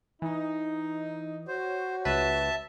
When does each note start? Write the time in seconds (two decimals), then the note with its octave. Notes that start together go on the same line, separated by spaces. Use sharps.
0.22 E3 D#4
1.48 F#4 C5 C#5
2.05 C#2 B4 E5 A5